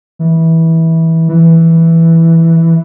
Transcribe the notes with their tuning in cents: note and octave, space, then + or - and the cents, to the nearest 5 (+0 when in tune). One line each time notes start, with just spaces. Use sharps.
E3 -20
E3 +0